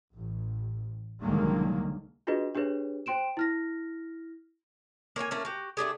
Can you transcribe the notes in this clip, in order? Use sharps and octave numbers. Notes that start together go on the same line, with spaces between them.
A1
C2 D3 D#3 F#3 G#3 A#3
D4 F4 F#4 G#4 B4 D#5
D4 G4 G#4 B4 C#5
C5 G5 C6 D7 E7
E4 F6 A#6
A#3 C#5 F5 G#5
A3 A#3 C#4
F#4 G4
A3 D4 G4 G#4